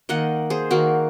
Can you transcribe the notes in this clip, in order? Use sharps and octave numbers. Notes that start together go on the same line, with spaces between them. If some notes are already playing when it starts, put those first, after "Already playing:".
D#3 A#3 D#5 F#5
G#4 C5
D#3 A#3 F#4 A#4